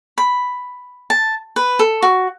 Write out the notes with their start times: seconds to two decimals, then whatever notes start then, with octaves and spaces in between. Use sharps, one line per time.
0.18 B5
1.10 A5
1.56 B4
1.79 A4
2.02 F#4